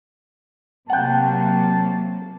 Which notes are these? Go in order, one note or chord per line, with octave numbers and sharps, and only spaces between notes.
C3 F#3 A#3 F#5 G5 A5